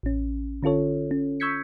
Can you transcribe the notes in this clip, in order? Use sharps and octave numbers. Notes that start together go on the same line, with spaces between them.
A1 C#4
D3 C#4 F4 A4 C#5
C#4
C#6 E6 G6 G#6 B6 C#7